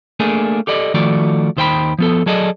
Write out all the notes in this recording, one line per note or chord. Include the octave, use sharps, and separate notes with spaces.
A3 A#3 D4 G#4
G4 A4 D5 D#5
D#3 F3 A3 F#4 D5
D#2 D#3 C5 E5 G5 B5
F3 B3 A4
F#3 G#4 A4 D5 D#5